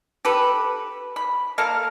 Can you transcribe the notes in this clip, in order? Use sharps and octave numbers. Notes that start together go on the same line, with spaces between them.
G4 A4 B4
B5
A#3 A4 A#4 F5